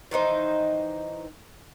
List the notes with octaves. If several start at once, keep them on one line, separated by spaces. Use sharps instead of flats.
D#3 E3 D#4 C5